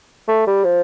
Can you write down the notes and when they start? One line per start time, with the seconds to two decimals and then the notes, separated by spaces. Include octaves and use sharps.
0.28 A3
0.47 G3
0.64 F3